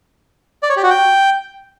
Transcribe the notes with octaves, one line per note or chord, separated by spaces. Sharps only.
D5
C#5
G4
F#4
G5